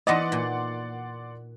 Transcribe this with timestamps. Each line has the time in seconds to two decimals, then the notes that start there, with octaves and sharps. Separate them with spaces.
0.07 E3 B3 D#4 D5 D#5 F#5 C6
0.32 A#2